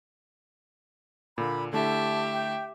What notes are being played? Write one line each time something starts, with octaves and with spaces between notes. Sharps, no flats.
A#2 D3 A#3 B5
D3 A3 E4 G4 E5 A5
G5